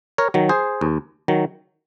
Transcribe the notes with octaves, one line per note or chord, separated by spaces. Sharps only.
A#4 C#5
D#3 F#3
G#4 C5
D#2
D#3 F#3